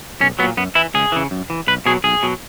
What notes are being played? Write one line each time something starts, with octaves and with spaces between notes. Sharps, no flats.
B1 C#4
A#2 F#3 B3
F#2 B3
E3 E4
C#2 G#4
C#3 E3
F#2
E3
B1 B4
B2 F#3 G#4
B1 G#4
B2 F#3